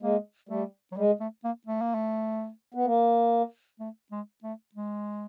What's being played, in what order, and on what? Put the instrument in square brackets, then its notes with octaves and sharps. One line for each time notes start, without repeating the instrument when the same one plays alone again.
[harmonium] G#3 [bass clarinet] A#3
[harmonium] G3 [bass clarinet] A3
[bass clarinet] F#3
[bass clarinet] G3 [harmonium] G#3
[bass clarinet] A3
A#3
A3
A#3
A3
[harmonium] B3
A#3
[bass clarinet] A3
G#3
A3
G#3